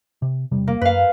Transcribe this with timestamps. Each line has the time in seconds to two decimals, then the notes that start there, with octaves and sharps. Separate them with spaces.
0.22 C3
0.51 E1 C3 G3
0.68 A#3
0.81 F#2 B4 F5